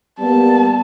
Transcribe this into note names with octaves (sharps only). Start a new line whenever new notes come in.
G3 A#3 B3 A5